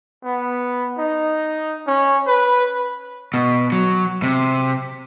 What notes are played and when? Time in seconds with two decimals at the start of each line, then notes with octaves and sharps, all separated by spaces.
0.24 B3
0.98 D#4
1.87 C#4
2.27 B4
3.34 B2
3.72 F#3
4.23 C3